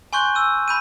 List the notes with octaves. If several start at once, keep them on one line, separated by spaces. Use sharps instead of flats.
G#5 C6 C#6 F#6 G6
E6 D#7
B5 G6 D#7